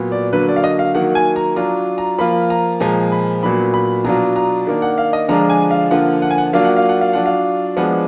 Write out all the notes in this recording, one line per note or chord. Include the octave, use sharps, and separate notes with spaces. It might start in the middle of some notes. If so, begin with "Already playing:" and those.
Already playing: A#2 F#3 B3
D5
D3 F#3 A#3 B4
D5
F5
D#5
F5
D#3 F#3 A#3 F#5
G#5
A#5
F#3 D4 F4 A#5
A#5
F3 A#3 F4 B5
A#5
A#2 F3 G#3 A#5
B5
A#2 F#3 B3 D4 B5
B5
B2 F#3 D4 F4 A#5
A#5
D#3 A#3 D4
F#5
F5
D#5
D3 F3 G#3 D4 F4 A#5
G#5
F5
D3 F3 A#3 F4 F#5
F#5
G#5
F#5
F#3 A#3 D4 F4 F5
F#5
F5
F#5
F5
F#3 D4 F4 F#5
F5
F3 G#3 B3 D4 F#5